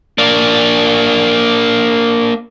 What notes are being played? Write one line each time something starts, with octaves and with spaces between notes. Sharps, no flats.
A#3 D4